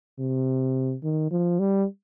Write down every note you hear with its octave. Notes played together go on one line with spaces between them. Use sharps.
C3
D#3
F3
G3